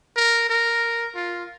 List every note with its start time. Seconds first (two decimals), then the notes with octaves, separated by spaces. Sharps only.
0.16 A#4
0.49 A#4
1.15 F4